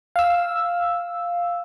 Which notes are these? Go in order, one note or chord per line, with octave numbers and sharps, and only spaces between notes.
F5 E6